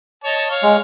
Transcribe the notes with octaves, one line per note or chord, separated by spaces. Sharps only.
C#5 D#5 A5
C#5 F5
G#3